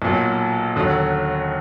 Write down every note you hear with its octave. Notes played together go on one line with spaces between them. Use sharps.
B1 A#2 F#3
D#2 D3 F#3